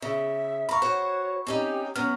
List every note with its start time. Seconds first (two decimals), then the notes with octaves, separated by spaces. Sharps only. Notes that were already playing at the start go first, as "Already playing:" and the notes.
0.02 C#3 E5
0.69 F5 A#5 B5 C#6
0.82 F#4 C5 C#5 F#5
1.47 C4 C#4 D#4 G4
1.96 F#3 B3 C#4 F6